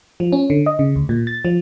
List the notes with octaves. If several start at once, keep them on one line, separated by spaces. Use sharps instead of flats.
F3
C#4
D3
D#5
C#3
D2
A#2
A6
F3